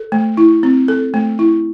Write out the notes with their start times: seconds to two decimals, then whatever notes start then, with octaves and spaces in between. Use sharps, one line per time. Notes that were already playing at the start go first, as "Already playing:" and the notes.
Already playing: A4
0.12 A3
0.37 E4
0.63 C4
0.88 A4
1.14 A3
1.39 E4